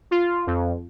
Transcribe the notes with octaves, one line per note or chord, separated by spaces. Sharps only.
F4
F2